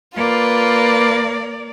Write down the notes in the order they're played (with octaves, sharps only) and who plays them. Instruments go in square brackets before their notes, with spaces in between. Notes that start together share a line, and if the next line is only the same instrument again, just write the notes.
[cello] A#3 D5 [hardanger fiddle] F4 B4